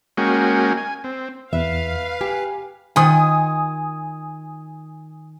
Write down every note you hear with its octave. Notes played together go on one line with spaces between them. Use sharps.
G#3 A#3 C#4 F#4 G5 G#5
G#5
C4
E2 B4 E5 F5
G4 G#5
D#3 F4 G5 G#5 D#6